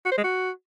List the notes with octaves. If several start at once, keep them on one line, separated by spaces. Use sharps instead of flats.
F#4
C5
G#3
F#4